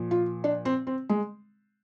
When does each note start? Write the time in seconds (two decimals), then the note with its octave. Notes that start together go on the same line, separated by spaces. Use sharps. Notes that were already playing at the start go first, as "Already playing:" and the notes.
Already playing: A#2 F3
0.11 F4
0.44 D4
0.65 C4
0.87 C4
1.09 G#3